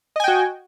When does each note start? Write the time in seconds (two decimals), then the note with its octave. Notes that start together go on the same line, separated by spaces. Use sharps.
0.16 D#5
0.20 G#5
0.24 G5
0.28 F#4